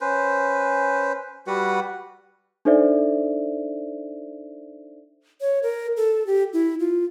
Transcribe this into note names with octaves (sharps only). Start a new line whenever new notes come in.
C#4 B4 C5
G3 F#4 B4 F#5
D4 D#4 A4 C5 D5 E5
C#5
A#4
A4
G4
E4
F4